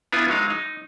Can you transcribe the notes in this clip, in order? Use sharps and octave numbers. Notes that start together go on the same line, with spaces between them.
B3 D4 E4 F4 G#5
F#3 G#3 D#4 F5
D#4